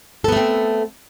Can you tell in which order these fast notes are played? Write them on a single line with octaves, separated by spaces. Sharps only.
A4 B3 A3 C4